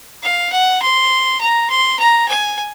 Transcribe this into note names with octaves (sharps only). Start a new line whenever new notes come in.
F5
F#5
C6
A#5
C6
A#5
G#5